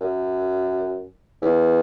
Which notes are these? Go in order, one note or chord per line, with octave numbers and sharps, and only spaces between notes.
F#2
E2